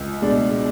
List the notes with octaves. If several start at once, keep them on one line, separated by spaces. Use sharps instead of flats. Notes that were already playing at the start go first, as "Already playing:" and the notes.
Already playing: C#2
B2 G#3 D4